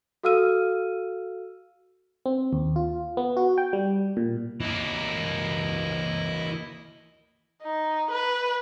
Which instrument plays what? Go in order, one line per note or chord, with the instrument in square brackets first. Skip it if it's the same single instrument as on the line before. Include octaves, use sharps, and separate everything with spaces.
[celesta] F#4 A4 F5 E6 F6 D#7
[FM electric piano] C4
D#2
F4
B3
F#4
G5
G3
A#2
[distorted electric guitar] E3 A#3 [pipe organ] E4 D#5
[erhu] D#4
B4